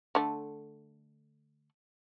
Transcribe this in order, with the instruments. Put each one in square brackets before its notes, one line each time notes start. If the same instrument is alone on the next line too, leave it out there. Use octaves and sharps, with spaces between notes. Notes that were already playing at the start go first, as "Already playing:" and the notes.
[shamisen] D3 A3